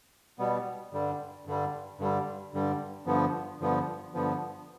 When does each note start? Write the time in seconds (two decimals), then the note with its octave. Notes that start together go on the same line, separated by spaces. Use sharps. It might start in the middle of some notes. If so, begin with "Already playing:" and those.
0.39 B2 G3 B3
0.93 G2 D3 G3
1.46 G2 D3 G3
1.99 G2 D3 G3
2.53 G2 D3 G3
3.06 G2 D3 F3 B3
3.61 G2 D3 F3 B3
4.14 G2 D3 F3 B3